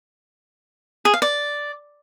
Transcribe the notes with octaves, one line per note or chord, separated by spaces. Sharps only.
G#4
F5
D5